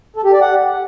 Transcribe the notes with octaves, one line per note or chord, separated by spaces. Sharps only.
A4
G4
D5
F#5